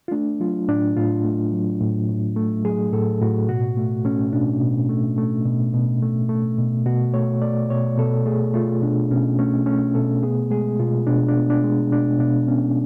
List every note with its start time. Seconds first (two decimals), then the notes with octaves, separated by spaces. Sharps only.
0.08 F4
0.11 A3 D4
0.40 F#3 F4
0.68 A2 D4
0.97 A2 F4
1.25 A3
1.52 F#3
1.81 A2
2.09 A2
2.36 A3
2.64 F#3 G#4
2.93 A2 A4
3.21 A2 F#4
3.49 B2 F#4
3.77 A3
4.05 A3 C#4
4.33 B2 D4
4.61 B2
4.89 A3
5.18 A3
5.45 B2
5.73 B2
6.02 A3
6.29 A3
6.58 B2
6.86 B2 F#4
7.14 A3 C#5
7.42 A3 D5
7.70 B2 C#5
7.98 B2 A4
8.26 A3 G#4
8.54 A3 F4
8.82 B2 D4
9.11 B2 C#4
9.39 A3 C#4
9.66 A3 C#4
9.95 B2 A4
10.23 B3 G#4
10.51 G#3 G#4
10.79 B2 F4
11.07 B2 D4
11.29 D4
11.36 B3
11.50 D4
11.64 G#3
11.91 B2 D4
12.19 B2 D4
12.48 B3 C#4